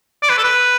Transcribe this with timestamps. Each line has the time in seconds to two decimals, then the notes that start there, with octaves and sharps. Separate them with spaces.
0.22 D5
0.29 B4
0.38 A4
0.44 B4